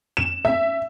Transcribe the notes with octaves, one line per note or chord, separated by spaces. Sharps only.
E7
E5